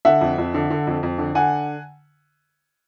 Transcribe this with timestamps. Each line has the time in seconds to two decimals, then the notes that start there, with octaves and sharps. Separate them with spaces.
0.05 D3 E5 F#5
0.21 F2
0.38 F2
0.54 D3
0.70 D3
0.87 F2
1.03 F2
1.18 D3
1.35 D3 F#5 G#5